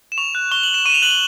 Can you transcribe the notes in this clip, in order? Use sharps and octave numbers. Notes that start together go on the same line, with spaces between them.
E7
C#6 F7
F#6
C#6 G7
F#7
F#6
E7
C#6 D#7 E7
F7
F#6 F#7
G7